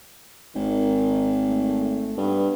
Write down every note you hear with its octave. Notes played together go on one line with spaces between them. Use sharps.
G#1 D#3
A3
G2 B3